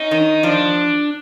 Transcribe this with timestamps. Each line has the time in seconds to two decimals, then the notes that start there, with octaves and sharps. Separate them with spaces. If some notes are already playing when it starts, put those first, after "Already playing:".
Already playing: C#4 D#4
0.11 D#3
0.43 F3 D4